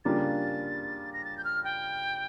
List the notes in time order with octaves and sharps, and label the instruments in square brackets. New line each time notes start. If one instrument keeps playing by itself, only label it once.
[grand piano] C#3 G3 A#3 D4 F4 [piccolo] A6
[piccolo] A#6
A6
G6
F6
G5